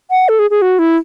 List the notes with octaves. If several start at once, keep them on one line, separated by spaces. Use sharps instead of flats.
F#5
A4
G#4
G#4
F#4
E4